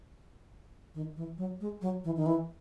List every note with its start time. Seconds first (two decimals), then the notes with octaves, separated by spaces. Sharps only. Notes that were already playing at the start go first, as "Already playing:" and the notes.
0.95 D#3
1.17 E3
1.38 F#3
1.61 G#3
1.82 F#3
2.04 E3
2.16 D#3
2.26 E3